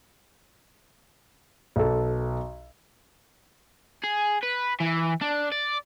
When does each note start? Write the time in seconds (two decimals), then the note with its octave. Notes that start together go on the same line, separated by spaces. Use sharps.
1.76 B1 A4
4.04 G#4
4.43 B4
4.81 E3
5.22 D4
5.52 D5